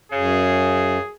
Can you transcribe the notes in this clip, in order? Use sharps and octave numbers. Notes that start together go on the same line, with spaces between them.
F#2 C#3 G#4